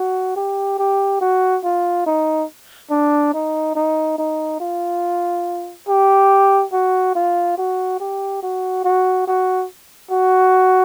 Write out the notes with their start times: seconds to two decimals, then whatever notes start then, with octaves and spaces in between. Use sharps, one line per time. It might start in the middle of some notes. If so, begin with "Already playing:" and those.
Already playing: F#4
0.36 G4
0.79 G4
1.21 F#4
1.64 F4
2.06 D#4
2.90 D4
3.33 D#4
3.75 D#4
4.18 D#4
4.60 F4
5.88 G4
6.72 F#4
7.15 F4
7.58 F#4
8.00 G4
8.42 F#4
8.84 F#4
9.27 F#4
10.11 F#4